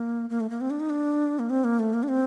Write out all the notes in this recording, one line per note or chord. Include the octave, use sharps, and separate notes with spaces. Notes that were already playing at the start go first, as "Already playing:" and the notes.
Already playing: A#3
A#3
A3
A#3
C4
D4
D#4
D4
A#3
C4
A#3
A3
A#3
D4
C4